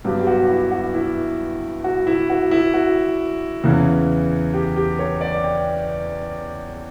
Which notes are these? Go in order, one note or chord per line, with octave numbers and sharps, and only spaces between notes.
G2 F#3 B3 G4
G4
F#4
F#4
E4
F#4
E4
F#4
E4
F#4
E4
F#4
E2 C#3 E3
G4
G4
C#5
D5
G5